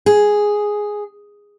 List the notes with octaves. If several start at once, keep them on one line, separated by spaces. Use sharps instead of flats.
G#4